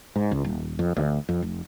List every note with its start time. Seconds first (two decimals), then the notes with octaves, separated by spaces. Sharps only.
0.16 G#2
0.31 C#2
0.44 D#1
0.79 F2
0.97 D2
1.29 F2
1.42 F1